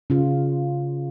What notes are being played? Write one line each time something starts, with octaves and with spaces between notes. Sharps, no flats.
C#3 F4